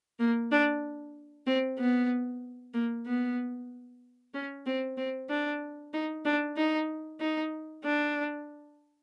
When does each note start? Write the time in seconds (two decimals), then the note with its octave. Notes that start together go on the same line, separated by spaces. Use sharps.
0.19 A#3
0.51 D4
1.47 C4
1.79 B3
2.74 A#3
3.06 B3
4.34 C#4
4.66 C4
4.97 C4
5.29 D4
5.93 D#4
6.25 D4
6.57 D#4
7.20 D#4
7.85 D4